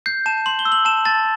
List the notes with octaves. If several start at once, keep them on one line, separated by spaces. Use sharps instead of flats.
G6 C7
A5 E7
C6 F#7
G7
E6
F#7
A5 E7
A5 A6